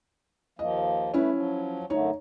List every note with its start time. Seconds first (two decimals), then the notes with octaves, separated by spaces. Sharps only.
0.59 D#2 F3 A#3 D#5
1.14 A3 C#4 E4 B4
1.31 F3 F#3
1.90 F#2 D3 A3 D#4 C#5